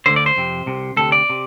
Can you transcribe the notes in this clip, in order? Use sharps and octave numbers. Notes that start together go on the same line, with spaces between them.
D2 D3 C5
D5
C5
F2 C3
C2 C3
D2 C3 A4
D5
C3